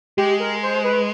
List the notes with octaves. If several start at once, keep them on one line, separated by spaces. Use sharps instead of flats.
G#3 G4
A#4
C5
B4